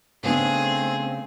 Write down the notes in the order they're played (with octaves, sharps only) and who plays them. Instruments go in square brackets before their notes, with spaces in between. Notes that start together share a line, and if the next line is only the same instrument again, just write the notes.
[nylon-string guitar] C#3 B3 D4 [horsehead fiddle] A3 C4 [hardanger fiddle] G#4